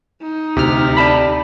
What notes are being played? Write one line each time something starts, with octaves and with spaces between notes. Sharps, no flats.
D#4
D2 C3 F6
D5 A5 B5